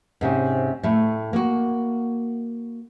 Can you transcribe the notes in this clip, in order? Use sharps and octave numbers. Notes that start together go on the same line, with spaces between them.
G#2 C3 C#4
A2 A3
A#3 F#4